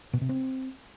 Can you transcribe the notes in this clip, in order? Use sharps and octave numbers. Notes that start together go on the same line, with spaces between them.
B2
C3
C4